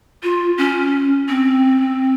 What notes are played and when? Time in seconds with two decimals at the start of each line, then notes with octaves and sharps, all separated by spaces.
0.23 F4
0.58 C#4
1.29 C4